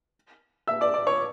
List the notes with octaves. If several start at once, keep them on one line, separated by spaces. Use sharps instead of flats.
E5 E6
D5 D6
D5 D6
C#5 C#6